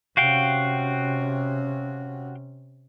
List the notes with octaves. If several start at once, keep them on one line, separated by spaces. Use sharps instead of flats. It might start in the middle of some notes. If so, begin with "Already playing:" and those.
C3 C#4 F#4 F5 G5